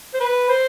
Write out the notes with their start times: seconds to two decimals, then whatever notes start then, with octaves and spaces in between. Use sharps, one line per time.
0.14 C5
0.20 B4
0.49 C5